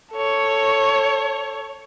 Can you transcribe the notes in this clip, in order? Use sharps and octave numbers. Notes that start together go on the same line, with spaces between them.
A4 C#5